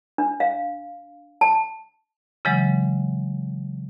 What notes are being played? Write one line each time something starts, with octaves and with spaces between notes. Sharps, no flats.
D4
F5
A5
C#3 E3 F#3 G#3